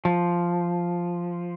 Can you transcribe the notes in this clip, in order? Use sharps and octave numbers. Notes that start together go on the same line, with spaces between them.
F3